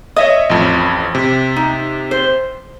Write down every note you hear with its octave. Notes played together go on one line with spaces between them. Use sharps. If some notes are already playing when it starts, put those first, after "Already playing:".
C#5 D#5 E5 D#6
A1 F2
C3
D#4
C5